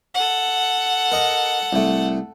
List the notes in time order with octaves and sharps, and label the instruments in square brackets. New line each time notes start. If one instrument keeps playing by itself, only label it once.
[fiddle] A4 F#5
[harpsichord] A#4 D#5 A#5
C2 A3